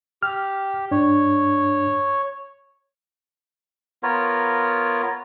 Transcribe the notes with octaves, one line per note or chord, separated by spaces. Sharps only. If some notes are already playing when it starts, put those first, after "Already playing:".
G4 F6
G2 D4 C#5
B3 F4 A#4 C#5